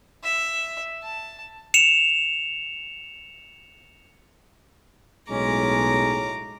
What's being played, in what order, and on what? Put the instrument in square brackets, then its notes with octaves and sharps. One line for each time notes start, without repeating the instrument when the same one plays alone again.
[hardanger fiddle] E5
A5
[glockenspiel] C#7 E7 F7
[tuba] B1 [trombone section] A2 G#3 [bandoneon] C#4 [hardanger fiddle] A#5 D6